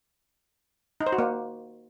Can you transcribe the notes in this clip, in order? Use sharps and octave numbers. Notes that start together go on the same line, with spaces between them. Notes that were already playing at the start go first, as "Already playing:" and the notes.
D#4
C5
F#4
A#3